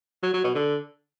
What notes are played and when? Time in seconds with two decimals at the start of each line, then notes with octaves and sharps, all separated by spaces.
0.23 F#3
0.34 F#3
0.44 B2
0.55 D3